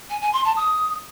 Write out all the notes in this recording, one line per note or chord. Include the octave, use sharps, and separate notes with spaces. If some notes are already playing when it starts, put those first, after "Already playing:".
G#5
G#5
C6
A5
D#6